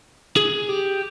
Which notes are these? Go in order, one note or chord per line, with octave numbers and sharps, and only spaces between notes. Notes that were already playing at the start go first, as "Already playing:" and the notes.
G#4
G4